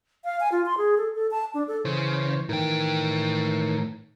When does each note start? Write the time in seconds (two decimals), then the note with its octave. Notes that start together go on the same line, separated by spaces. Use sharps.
0.25 F5
0.40 G#5
0.52 F4
0.66 C6
0.78 G#4
0.98 A4
1.15 A4
1.31 A5
1.54 D4
1.68 A4
1.85 C#3 E3 C5 C#5
2.49 A2 D#3 E3 A#4 G5